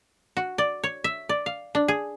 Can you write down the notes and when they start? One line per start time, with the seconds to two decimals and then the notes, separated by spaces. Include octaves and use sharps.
0.37 F#4
0.58 D5
0.84 C#5
1.04 E5
1.29 D5
1.46 F5
1.75 D4
1.88 G#4